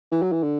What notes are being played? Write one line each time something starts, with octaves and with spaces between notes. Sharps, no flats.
E3
F#3
E3
D3